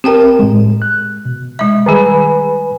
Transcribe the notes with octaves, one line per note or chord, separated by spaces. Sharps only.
C4 G4 A#4 G5 A5
A2 G#3
F#6
B2
G#3 E5
D#3 G3 G#4 B4 G#5 B5